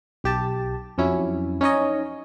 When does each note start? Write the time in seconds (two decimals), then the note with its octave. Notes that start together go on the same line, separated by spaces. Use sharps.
0.24 B1 G4 A5
0.98 F2 F#3 C#4 E4
1.61 C#4 D#4 C#5 D#5